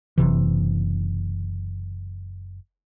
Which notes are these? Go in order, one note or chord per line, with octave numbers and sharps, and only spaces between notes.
F#1 C2 C3 E3